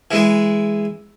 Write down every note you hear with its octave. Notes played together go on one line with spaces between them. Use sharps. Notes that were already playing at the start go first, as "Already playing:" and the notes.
E3 G#3 E4